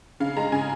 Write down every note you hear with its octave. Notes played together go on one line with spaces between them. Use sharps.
C#3 F5
G#3 A#5
C#3 G#5